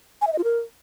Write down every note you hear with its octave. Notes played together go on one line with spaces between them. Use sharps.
G#5
E5
D#5
F4
A#4